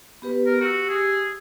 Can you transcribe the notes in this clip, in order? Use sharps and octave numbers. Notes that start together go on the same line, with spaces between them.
B3 G4 B4
A#4
F#4 G4 E6
G#4